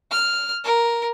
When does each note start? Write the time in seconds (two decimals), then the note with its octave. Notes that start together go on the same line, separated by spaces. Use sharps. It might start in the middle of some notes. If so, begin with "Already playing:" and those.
0.11 F6
0.64 A#4